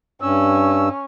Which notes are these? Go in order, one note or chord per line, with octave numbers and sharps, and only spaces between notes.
G2 C#4 E6